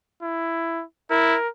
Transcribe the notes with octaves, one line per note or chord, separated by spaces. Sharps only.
E4
E4 A#4